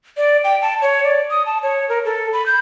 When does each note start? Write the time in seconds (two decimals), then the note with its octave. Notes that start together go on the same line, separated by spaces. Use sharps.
0.17 D5
0.44 G5
0.62 A5
0.82 C#5
1.04 D5
1.31 D#6
1.46 A5
1.63 C#5
1.89 A#4
2.05 A4
2.33 B5
2.46 G6